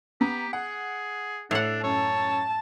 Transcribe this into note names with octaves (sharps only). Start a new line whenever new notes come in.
B3 G4 A#5
G#4 F#5
A2 D4 F#5 E6 C7 F7
F#2 C#5 A5